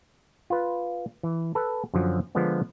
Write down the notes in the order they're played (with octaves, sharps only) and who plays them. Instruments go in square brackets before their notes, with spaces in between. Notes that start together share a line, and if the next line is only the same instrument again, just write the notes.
[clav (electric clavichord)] F4 B4
E3
A4 B4
F#2 D3 F3 F#3
D3 F3 G#3 B3 D4